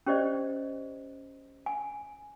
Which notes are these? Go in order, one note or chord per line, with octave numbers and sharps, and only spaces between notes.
C#4 G4 C5 D5 D#5
G#5